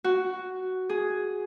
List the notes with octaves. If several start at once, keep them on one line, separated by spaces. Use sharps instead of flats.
F#4
G#4